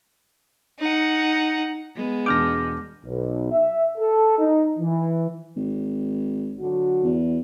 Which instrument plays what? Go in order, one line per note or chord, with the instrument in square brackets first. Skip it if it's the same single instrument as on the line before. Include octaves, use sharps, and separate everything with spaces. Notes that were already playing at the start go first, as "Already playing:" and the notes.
[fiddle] D#4 F#5
[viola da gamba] G#3 B3
[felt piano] E1 D4 G6 [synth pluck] D6 F6 A#6
[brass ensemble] B1
E5
A4
D#4
E3
[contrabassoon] G#1
[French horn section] D3 F#3 F#4
[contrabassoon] E2